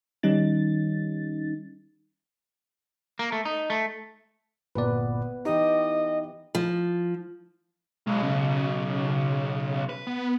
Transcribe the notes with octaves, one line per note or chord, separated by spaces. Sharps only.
D#3 G3 C#4 D#4 A6
A#3
A3
D#4
A3
G1 A#2 B3 B4 D5
E3 D#4 G4 D#5
F3
B1 G#3
C#3
B4
B3